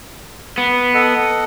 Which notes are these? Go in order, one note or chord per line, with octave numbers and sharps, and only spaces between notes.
B3
A4 D#5 F#5